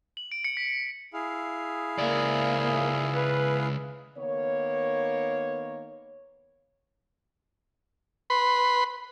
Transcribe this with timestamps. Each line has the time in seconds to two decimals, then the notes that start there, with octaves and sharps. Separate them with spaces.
0.17 F#7
0.32 D7
0.45 C#7
0.57 B6
1.13 E4 G#4 F5
1.98 C#2 A#3 D5
3.15 B4
4.18 D#3 A#3 B3 C#5
8.30 B4 B5 C6